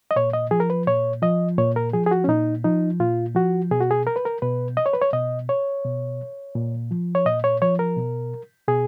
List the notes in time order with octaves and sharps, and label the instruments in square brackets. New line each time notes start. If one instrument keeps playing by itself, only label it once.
[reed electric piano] D#5
A#2 C#5
D#5
F3 G#4
A#4
B4
A#2 C#5
F3 D#5
A#2 C#5
A#4
F3 G#4
G#4
F#4
C#4
A#2 D#4
F3 D#4
A#2 F4
F3 F#4
B2 G#4
F#4
G#4
A#4
B4
A#4
B2 B4
D#5
C#5
B4
C#5
B2 D#5
C#5
B2
A#2
F3
C#5
A#2 D#5
C#5
F3 C#5
A#4
B2
B2 G#4